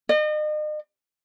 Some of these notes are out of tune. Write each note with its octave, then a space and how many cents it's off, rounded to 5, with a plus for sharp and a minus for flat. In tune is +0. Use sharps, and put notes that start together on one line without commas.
D#5 -40